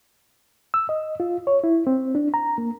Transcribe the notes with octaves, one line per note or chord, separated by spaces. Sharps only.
E6
D#5
F4
C#5
E4
C4
D4
A#5
A#3